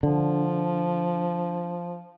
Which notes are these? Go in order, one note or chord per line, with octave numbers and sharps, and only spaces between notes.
D3 F3